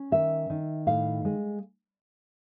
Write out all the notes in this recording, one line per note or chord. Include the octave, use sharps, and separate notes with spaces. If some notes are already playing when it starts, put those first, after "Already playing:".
Already playing: C#4
D#3 E5
D#3
A2 F5
G#3